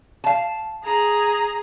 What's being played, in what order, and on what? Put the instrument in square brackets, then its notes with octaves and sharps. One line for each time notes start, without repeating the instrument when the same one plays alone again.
[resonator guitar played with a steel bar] F5 A5
[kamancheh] G#4 A#5